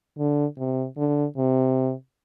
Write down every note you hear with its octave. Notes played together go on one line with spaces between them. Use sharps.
D3
C3
D3
C3